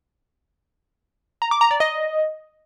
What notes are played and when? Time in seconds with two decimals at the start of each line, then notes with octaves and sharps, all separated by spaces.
1.42 A#5
1.51 D6
1.61 A#5
1.71 D5
1.80 D#5